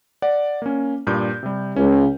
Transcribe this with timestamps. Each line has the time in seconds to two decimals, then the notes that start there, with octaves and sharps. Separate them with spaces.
0.22 D5 F#5
0.62 A#3 C#4
1.07 G2 A#2 G6
1.43 C3 G3
1.76 C#2 C#4